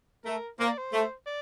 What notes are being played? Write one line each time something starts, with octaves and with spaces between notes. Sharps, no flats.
A3 A#4
A#3 C5
D5
C5
A3
D5